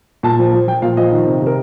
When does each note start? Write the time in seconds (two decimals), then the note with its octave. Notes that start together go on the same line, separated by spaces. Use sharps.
0.23 A#2 A5
0.39 F3
0.53 F3
0.67 F3 G5
0.82 A#2 F5
0.97 F3 D#5
1.12 D#3
1.27 C3
1.42 C3 A#4